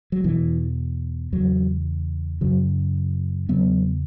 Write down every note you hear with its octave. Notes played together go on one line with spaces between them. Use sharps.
F#3
E2 B2 E3
E2 C#3 F#3
F#2 C#3 F#3
E2 C#3 F#3 B3